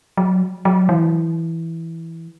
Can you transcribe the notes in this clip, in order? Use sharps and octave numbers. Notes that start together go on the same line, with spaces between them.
F#3
F#3
E3